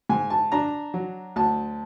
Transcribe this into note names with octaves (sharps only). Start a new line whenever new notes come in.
G#2 G#5
A5
D4 A#5
F#3
D2 A5